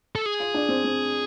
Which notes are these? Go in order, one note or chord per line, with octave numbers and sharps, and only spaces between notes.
A4
G#4
F4
D4
C4
C4